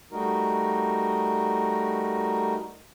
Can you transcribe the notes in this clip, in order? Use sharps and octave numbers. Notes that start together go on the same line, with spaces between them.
G3 A3 D#4 F#4 A#4